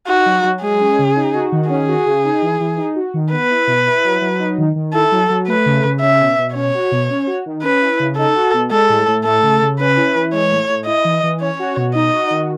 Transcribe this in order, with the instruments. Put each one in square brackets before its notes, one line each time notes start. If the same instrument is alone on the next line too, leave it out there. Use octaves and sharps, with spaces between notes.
[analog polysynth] D#4 [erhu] F#4
[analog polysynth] F#3
F#3
[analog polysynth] G#3 [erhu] G#4
[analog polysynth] C#4
C#3
D#4
F#4
D#3
[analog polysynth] C#4 [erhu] G#4
[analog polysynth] F#4
C#3
D#4
E3
E3
D#4
F#4
D#3
[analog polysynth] B3 [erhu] B4
[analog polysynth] E4
B2
E4
F#3
F#3
D#4
D#3
D#3
[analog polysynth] E4 [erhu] A4
[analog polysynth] F#3
F#3
[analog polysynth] A3 [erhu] B4
[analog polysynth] C#3
C#3
[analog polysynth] C#4 [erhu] E5
[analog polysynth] B2
B2
[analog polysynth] C#4 [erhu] C#5
[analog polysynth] F#4
B2
C#4
F#4
D#3
[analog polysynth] C#4 [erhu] B4
[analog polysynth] E4
C#3
[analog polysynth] D#4 [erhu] A4
[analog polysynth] F#4
B2
[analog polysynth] G#3 [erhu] A4
[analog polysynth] A2
A2
[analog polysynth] A3 [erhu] A4
[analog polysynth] C#3
C#3
[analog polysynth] C#4 [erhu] B4
[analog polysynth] E4
E3
[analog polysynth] G#3 [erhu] C#5
[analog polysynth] A2
A2
[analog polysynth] E4 [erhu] D#5
[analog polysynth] E3
E3
[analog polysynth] C#4 [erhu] C#5
[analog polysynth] F#4
B2
[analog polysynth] D#4 [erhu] D#5
[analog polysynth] F#4
D#3